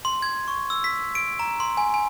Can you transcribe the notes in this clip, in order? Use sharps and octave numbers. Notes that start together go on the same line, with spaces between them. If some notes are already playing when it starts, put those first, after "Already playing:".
C6
G#6
C#6
E6
B6
D7
A#5
C6
G#5
G#5